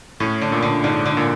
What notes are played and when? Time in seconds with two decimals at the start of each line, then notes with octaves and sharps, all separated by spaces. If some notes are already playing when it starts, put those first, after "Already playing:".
0.20 A2 C#4
0.42 D3
0.52 A#2
0.62 D3
0.84 G#2 D3
1.06 D3
1.17 A#2